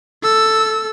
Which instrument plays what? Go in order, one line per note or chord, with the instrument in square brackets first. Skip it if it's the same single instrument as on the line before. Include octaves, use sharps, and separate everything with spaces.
[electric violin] A4 E6